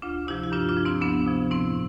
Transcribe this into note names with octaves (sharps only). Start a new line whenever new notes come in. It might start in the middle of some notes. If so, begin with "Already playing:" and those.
D2 D4 F4
C3 F3 E4 G4
G4
G2 D4 F4
D4 F4
F3
C4 E4
D2 B3 D4
C3 F3
A2 C4 E4